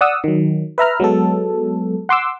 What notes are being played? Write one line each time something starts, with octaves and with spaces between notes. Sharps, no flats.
D5 F#5 D#6 E6
D#3 F#3
B4 E5 A#5 F6
F#3 G#3 B3 A4
F#5 C6 D6 E6